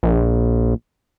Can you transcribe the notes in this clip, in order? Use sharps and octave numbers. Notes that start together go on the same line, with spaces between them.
A#1